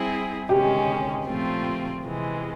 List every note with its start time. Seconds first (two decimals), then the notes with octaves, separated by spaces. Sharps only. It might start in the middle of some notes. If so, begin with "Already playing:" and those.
Already playing: G3 C4 E4 G#4
0.49 C3 D#3 G#3 C#4 G4
1.26 A#2 F3 A3 C4 F4
2.03 C3 E3 G#3